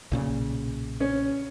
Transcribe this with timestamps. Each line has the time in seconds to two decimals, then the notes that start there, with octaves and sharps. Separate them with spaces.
0.12 B1 A#2 C#3
1.00 C#4